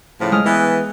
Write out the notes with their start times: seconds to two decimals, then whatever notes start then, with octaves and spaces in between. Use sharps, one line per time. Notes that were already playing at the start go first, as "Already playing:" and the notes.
0.20 A2 C#3 F3
0.32 G#3 D#5 F6
0.46 E3 B3